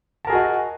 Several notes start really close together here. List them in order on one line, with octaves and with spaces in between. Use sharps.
A5 A#4 G#4 F#4 D#5